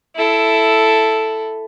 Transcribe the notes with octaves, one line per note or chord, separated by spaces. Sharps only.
E4 A4